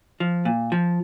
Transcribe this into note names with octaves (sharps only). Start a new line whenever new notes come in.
F3
A#2
F3